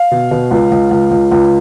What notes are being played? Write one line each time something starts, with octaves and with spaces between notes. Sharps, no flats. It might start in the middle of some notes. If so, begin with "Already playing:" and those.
Already playing: F5
B2
B2
C#2
C#2
C#2
C#2
C#2